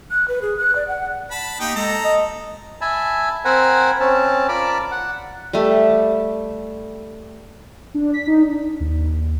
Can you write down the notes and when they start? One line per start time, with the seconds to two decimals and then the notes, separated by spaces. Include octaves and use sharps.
0.11 F#6
0.28 B4
0.42 G#4
0.58 F#6
0.75 D5
0.88 F#5
1.31 A5 B5
1.60 A#3 D#4 G4 G5
1.76 G#3 A4 A#5
2.04 D#5
2.81 E5 G#5 A5 B5
3.45 C4 A#4 C5 F#5 G#5 B5
4.00 C4 C#4 A5
4.48 F4 A#4 D5 A5 B5 D6
4.91 F#5
5.53 G3 A3
7.94 D4
8.13 B6
8.27 D#4
8.42 D4
8.81 D#2